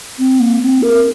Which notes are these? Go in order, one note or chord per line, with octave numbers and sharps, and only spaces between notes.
C4
A#3
C4
A#4